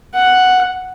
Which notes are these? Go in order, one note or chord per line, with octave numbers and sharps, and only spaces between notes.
F#5